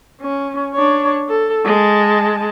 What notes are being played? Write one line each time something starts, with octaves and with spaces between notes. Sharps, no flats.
C#4
D4 C#5
A4
G#3 A5